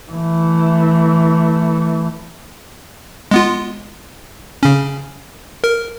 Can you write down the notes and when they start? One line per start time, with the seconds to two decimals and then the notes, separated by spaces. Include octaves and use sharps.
0.11 E3 A3
3.31 G#3 B3 F4
4.63 C#3 C#4
5.64 A#4